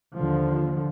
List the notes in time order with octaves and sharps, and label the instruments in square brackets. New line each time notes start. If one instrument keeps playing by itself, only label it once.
[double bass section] D#2 D3 F3